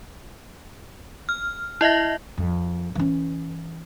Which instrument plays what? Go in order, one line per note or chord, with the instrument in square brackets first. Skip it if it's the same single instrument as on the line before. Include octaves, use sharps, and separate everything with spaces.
[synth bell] F6
E4 D#5 E5 A#6
[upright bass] F2
E3 C#4